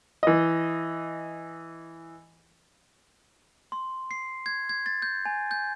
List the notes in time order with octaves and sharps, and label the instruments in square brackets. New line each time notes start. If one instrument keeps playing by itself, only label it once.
[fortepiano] E3 D#5
[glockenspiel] C6
C7
G#6
G#6
A6
G6
G#5
G6